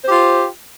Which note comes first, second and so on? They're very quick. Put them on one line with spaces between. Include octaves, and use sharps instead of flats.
C5 G4 F4